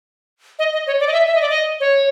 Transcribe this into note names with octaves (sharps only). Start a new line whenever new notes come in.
D#5
D#5
C#5
D5
D#5
E5
E5
D#5
D5
D#5
C#5